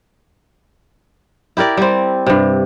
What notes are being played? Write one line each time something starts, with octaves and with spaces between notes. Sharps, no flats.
E4 G4 A#4 D5
G3 C4
G2 C3